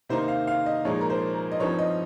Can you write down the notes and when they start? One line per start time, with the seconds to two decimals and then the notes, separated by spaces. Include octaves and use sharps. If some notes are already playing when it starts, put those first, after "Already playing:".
0.09 C3 D#3 A#3 D#4 C5
0.28 F5
0.47 F5
0.66 D#5
0.85 A#2 F3 G#3 D#4 C#5
1.01 A#4
1.10 C5
1.34 A#4
1.52 D#5
1.60 G2 F3 C4 D#4 C#5
1.79 D#5